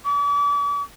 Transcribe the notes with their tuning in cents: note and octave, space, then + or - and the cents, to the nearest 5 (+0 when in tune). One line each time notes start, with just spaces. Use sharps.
D6 -45